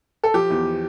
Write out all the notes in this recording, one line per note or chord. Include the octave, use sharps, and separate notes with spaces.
A4
F3 G4
E2